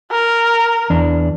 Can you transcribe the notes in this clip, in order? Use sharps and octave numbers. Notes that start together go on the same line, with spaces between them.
A#4
E2 D4